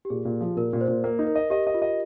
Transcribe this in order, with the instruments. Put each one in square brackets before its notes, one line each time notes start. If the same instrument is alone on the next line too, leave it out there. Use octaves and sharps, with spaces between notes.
[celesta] G4
[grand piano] A#2 [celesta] G#4
[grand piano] A#2
F3
[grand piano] A#2 [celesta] A#4
[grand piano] A#2
[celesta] C5
[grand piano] A#2
[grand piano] A#3 [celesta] A#4
[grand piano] D#4
[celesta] A#4
[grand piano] D#5
[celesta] G4 [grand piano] D#5
[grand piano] D#5
[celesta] F4
[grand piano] D#5